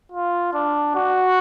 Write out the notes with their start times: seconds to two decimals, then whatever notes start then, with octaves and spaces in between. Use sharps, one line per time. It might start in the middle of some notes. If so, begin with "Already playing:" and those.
0.12 F4
0.54 D4
0.95 F#4